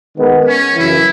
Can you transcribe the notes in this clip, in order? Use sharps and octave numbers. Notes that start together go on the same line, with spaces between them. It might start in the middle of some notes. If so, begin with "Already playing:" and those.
D#3 G#3 B3 D#4 A#4
C#4
F#2 C#3 E3 E4